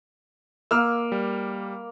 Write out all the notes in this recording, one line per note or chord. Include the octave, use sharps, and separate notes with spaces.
A#3 E6 F6
G3